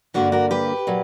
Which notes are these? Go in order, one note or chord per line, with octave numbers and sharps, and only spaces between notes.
G2 D3 A#3 D4 F#4
F#4 A#4
G4 B4
A#2 F#3